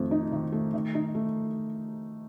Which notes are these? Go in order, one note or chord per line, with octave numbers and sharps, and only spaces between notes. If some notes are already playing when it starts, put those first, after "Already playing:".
Already playing: F2 D#3 A3
D#4
D#3
A3
D#3
D#4
A3